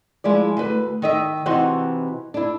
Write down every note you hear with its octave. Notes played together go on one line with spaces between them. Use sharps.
F3 G#3 E4 D5
D2 B4
D#3 D#5 E5
C3 E3 D#4 F#4 C5 F#5
D4 E4